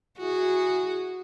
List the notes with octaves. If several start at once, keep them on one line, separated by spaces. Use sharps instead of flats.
E4 F#4 G#4